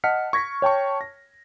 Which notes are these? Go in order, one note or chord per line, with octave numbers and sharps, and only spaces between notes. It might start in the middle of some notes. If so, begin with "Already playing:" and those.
D#5 F#5 A5 F6 B6 C#7
C#6 G#6 A#6 B6
C#5 G5 A5 C#6
A#6